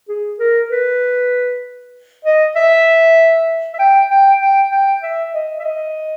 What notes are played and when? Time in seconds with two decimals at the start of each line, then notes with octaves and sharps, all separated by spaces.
0.08 G#4
0.39 A#4
0.70 B4
2.25 D#5
2.56 E5
3.74 E5
3.79 G5
4.10 G5
4.41 G5
4.71 G5
5.03 E5
5.33 D#5
5.59 E5
5.64 D#5